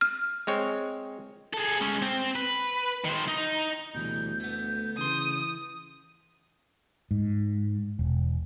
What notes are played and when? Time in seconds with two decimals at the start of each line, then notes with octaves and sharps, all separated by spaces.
0.01 F6
0.47 G#3 C4 C#5
1.54 G#4 A4
1.81 G#3 C#4
2.02 C4
2.36 B4
3.04 D#3 C5
3.28 D#4
3.94 D2 B2 E3 G3 G6
4.40 A3 B3
4.98 C#3 E3 C6 D#6
7.11 G#2
7.99 E1